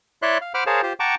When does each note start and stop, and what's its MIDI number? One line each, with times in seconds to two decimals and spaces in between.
0.22 0.38 64
0.22 0.38 73
0.22 0.38 74
0.22 0.38 76
0.22 0.38 84
0.22 0.38 90
0.41 0.53 77
0.54 0.64 72
0.54 0.64 78
0.54 0.64 83
0.54 0.64 86
0.54 0.64 89
0.66 0.81 68
0.66 0.81 70
0.66 0.81 72
0.66 0.81 73
0.66 0.81 77
0.66 0.81 81
0.83 0.93 65
0.83 0.93 67
0.83 0.93 72
1.00 1.15 78
1.00 1.15 79
1.00 1.15 81
1.00 1.15 82
1.00 1.15 85
1.00 1.15 86